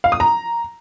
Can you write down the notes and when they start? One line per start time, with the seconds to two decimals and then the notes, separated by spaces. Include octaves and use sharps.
0.04 F5
0.12 D#6
0.20 A#5